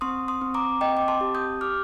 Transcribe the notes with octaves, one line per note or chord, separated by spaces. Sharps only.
C4 C6 D#6
C6 D#6
C4
A#5 D6
C4 D#5 G5
D6
A5 C6
G4
D#6 G6
G4 D6 F6